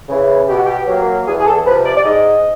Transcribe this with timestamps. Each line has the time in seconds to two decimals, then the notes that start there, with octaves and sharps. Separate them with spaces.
0.09 C#3 E3
0.49 B2 G4
0.57 F#4
0.65 G4
0.87 F#3 A#3
1.27 E2 G#4
1.40 G#4
1.46 A4
1.66 C3 F3 B4
1.85 D5
1.96 D5
2.05 G#2 D#5